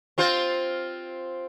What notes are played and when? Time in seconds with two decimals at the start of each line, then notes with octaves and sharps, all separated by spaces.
0.18 C4 F4 C5